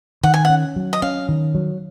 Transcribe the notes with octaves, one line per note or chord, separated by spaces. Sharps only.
D#3 F#5
G#5
F#5
C#4
F#3
D#5
C#4 F5
D#3
F#3